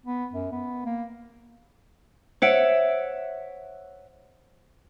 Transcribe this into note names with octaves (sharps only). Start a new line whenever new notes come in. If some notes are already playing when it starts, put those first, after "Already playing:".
B3
F#2
B3
A#3
C5 C#5 E5 F#5 C#7 D7